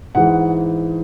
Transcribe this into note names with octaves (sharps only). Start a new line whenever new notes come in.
G#2 E3 G#3 F#5